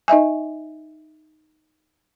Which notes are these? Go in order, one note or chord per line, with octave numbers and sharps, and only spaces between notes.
D#4 D#5 E5 G#5